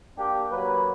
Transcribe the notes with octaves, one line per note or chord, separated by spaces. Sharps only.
A#3 D4 G4
F#3 A#3 B4